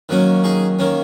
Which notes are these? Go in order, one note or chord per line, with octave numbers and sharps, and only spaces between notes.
D#3 F#3 A#3 C#4
D#4 G#4
D#3 A#3 C#4